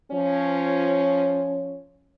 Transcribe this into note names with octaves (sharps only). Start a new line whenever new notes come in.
F3 C#4 C#5